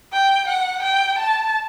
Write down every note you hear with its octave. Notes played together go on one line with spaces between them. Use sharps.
G5
F#5
G5
A5